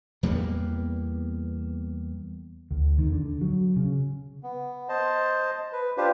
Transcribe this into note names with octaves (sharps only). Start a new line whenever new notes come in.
E2 G3 A#3 B3
D2
E2 D#3
D3
F#3
C#3
B3
C5 D#5 A5
B4
D4 F4 G4 B4 C5